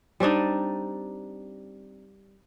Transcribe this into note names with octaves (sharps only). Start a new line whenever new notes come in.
G3 C4 D4 D#4